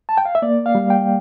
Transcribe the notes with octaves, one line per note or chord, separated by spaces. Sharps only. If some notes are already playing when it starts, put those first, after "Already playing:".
A5
G5
F5
E5
A#3 D5
F5
G3
G5